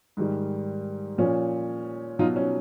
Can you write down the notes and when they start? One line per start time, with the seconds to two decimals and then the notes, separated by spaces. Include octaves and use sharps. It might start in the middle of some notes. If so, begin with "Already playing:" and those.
0.17 G#2 D#3 G3
1.18 A#2 F3 C#4
2.19 B2 F#3 D#4 F4
2.36 C#4